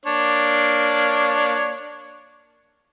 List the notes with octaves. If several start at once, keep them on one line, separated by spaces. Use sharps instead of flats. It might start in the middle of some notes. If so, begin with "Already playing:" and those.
A#3 D4 C#5